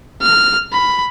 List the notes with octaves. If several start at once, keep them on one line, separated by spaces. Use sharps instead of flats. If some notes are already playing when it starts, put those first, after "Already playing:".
F6
B5